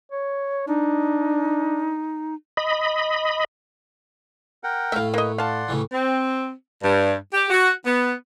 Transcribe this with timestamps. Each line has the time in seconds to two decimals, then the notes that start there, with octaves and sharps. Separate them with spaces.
0.12 C#5
0.67 D4 D#4
2.57 D#5 B5
4.64 A#4 F#5 G5
4.92 A2 A3 E5 F5
5.14 A#3 B4 D#5
5.38 D5 F5 F#5 A5 C6
5.68 A2 C#3 E3
5.92 C4
6.83 G2
7.34 G4
7.50 F#4
7.85 B3